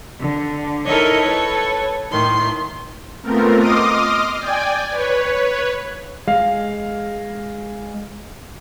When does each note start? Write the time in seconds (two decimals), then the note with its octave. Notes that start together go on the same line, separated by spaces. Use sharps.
0.19 D3
0.86 D#4 E4 A4 A#4 C#5 D#5
1.22 A4 B4 C#5
2.11 A2 D#3 C6
3.22 A3 B3 C4 F4 A#4
3.57 D#5 C6 D6 D#6 F6
4.38 D5 G5 G#5
4.90 B4 C#5
6.28 G#3 F5